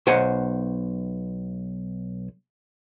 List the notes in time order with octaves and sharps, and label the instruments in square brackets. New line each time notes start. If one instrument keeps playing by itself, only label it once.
[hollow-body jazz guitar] B1 C5 F#5 G#5